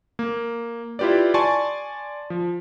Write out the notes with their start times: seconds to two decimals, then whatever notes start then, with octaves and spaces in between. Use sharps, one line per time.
0.19 A#3
0.99 E4 F4 G4 B4 D5
1.34 D5 G#5 A5 C6 C#6
2.30 F3